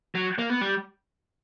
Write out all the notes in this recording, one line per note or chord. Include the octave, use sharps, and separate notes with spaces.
F#3
A#3
B3
G3